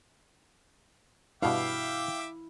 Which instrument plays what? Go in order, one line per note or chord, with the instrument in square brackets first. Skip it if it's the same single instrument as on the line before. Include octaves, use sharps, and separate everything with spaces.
[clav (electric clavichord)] G2 B2 [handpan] E4 [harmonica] E5 G5 D6 [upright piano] F5